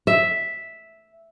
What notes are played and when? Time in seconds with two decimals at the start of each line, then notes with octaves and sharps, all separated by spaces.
0.07 E5